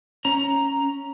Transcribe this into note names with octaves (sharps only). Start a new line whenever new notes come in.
C#4 A#5